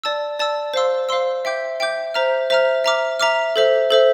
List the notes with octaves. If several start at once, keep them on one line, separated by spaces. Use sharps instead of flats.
D5 A5 E6
D5 A5 E6
C5 F5 C6 E6
C5 F5 C6 E6
E5 G5 D6 G6
E5 G5 D6 G6
C5 E5 A#5 F6
C5 E5 A#5 F6
E5 A#5 D6 F6
E5 A#5 D6 F6
A4 C5 E5
A4 C5 E5